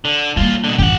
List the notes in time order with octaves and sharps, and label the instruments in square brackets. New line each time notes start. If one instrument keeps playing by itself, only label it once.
[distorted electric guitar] D3
[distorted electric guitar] A2 F4 [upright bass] G3 A#3
[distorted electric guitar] B2 D3
[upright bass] A1 F#2 [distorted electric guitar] G4 F#5